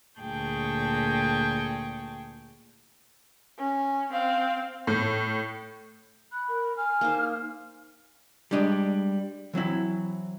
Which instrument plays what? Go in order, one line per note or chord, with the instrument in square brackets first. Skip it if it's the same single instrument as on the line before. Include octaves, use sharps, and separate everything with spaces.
[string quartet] D2 A#2 G#4 G5 A5 C#6
[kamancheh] C#4
C4 F5
[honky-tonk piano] A2
[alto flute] B5 [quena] F#6
[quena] A#4
[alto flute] G#5 [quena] F6
[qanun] A#3 D#4 C5
[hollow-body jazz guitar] G3 G#3 D4 G4 D#5
E3 F#3 C4 E4